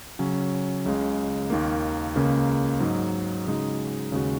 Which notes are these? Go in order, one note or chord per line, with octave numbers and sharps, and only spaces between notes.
C#3 F#3 C#4
C#2 C#3 G#3
D#2 D#3 A#3
C#2 C#3 A#3
G#2 F#3 D#4
C#3 G#3 D#4 F#4
D#2 C#3 G#3 F#4